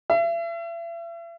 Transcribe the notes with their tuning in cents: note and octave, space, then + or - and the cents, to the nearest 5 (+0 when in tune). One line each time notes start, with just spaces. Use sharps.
E5 +40